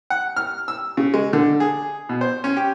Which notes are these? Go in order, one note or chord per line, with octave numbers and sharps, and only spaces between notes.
F#5
F6
E6
C#3
G#3
D3
G#4
B2
C5
C#4
G4